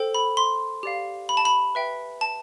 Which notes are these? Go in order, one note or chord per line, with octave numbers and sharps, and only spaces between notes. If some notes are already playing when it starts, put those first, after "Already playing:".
Already playing: A4 C5 G5
B5
C6
G4 D5 F5
B5
A5
B5
B4 E5 G5
A5